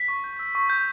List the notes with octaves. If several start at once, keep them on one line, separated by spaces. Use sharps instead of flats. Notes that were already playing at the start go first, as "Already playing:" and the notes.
Already playing: B6
C#6
G6
E6
C#6
G6